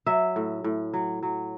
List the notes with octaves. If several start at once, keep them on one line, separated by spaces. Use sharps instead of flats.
F#3 E5
A2
A2
F#3
F#3